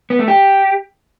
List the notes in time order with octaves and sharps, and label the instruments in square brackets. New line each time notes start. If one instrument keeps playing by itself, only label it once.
[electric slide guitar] B3
A3
G4